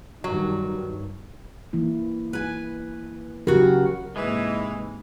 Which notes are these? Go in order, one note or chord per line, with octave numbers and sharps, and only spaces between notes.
G2 D#3 F#3
E3 A#3 E4
B4 G#5
C#3 F#3 F#4 G4 A#4
G#2 C3 E3 G#3 A#3 G#4 B4 D#5